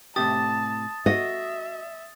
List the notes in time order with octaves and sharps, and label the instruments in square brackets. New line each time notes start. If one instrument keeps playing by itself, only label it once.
[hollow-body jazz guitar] A2 C3 G4 [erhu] A5 [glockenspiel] D#6 A6
[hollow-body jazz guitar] F#4 [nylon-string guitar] D#5 [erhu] E5